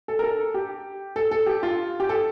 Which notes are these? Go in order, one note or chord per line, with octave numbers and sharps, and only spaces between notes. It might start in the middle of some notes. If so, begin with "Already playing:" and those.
A4
A#4
A4
G4
A4
A4
G4
F4
G4
A4